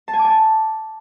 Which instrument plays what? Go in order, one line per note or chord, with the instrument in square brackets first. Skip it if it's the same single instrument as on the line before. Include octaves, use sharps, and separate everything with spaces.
[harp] A5
G#5
D6
G#5
A5